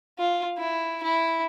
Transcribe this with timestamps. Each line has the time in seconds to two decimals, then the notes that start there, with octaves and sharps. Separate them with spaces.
0.19 F4
0.58 E4
1.03 E4